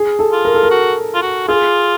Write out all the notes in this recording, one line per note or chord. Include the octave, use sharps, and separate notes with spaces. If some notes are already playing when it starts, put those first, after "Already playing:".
Already playing: G#4
A4
F4
A#4
A4
A#4
F#4
F4
F#4
F4 G#4